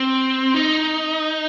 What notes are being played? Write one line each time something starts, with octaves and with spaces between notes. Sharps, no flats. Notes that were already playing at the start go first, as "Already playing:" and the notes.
Already playing: C4
D#4